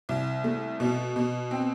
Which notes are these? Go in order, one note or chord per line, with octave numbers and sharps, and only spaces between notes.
C2
A3
B2
B2
C4